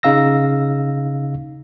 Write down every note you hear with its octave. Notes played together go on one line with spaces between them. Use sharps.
C#3 D#4 F5 E6 A#6